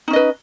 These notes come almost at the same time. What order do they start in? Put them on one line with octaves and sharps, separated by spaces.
D#4 C#4 D#5 B4